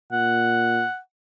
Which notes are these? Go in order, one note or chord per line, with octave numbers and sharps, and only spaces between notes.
A#2 F#5